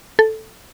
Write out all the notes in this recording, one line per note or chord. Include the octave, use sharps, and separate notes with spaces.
A4